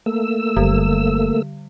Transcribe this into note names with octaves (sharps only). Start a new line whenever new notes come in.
A3 A#3 E6
F#1 D3 G3